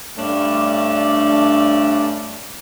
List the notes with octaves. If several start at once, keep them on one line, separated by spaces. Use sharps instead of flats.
G2 A3 C#4 D4 D5